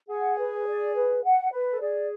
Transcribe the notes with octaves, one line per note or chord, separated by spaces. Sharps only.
G#4 F#5
B4
D5
B4
F#5
B4
A4
G#4 D5